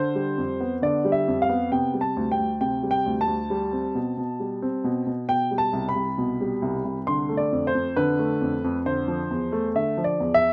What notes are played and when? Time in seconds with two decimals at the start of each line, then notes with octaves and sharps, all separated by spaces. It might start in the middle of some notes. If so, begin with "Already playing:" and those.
Already playing: D3 C5
0.15 G3
0.38 F2
0.60 B3
0.82 D3 D5
1.05 G3
1.12 E5
1.27 F2
1.42 F5
1.49 B3
1.72 C3 G5
1.94 G3
2.01 A5
2.16 D2
2.31 G5
2.39 D2
2.61 C3 G5
2.83 G3
2.91 G5
3.06 D2
3.21 A5
3.27 D2
3.50 G3
3.73 C4
3.95 B2
4.17 B2
4.40 G3
4.62 C4
4.84 B2
5.07 B2
5.29 B2 G5
5.51 G3
5.58 A5
5.73 C2
5.89 B5
5.96 C2
6.18 B2
6.41 G3
6.62 C2
6.85 C2
7.07 D3 C6
7.29 A3
7.37 D5
7.52 F2
7.67 C5
7.75 F2
7.96 D3 B4
8.19 A3
8.41 F2
8.64 F2
8.86 D3 C5
9.08 F3
9.31 E2
9.52 A3
9.75 D3 E5
9.97 F3
10.04 D5
10.20 E2
10.34 E5